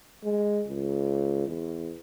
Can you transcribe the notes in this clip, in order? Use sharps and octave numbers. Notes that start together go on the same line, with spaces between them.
G#3
C#2
E2